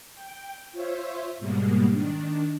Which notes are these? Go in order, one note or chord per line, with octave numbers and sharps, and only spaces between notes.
G5
F4 C5 C#5 E5
G#2 B2 G3 G#3 A#3
D#3 D4